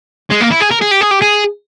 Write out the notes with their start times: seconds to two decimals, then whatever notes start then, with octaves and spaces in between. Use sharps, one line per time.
0.30 G#3
0.40 A#3
0.51 E4
0.60 G#4
0.71 A#4
0.81 G#4
0.91 G4
1.01 G#4
1.11 G4
1.22 G#4